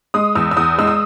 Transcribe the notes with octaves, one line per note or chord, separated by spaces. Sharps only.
G#3 D#6
E2 E6
E6
E2 D#6
G#3 E6
D#6